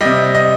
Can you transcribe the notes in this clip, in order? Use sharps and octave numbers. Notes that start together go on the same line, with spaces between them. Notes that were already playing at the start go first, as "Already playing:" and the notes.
C3 G3 D#5
D#5